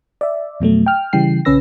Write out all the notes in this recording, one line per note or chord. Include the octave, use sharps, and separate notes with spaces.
D5 E5
F2 B2 F#3 A3
G5 F6
C#3 E3 G3 G5 C7
A#1 C#3 C#4 B4 E6 A#6